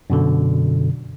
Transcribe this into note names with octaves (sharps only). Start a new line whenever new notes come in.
F#2 B2 D3